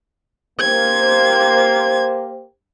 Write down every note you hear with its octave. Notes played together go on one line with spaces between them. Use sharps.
A#3 G4 C5 G#6